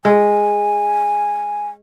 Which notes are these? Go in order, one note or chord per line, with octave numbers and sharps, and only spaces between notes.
G#3 G#5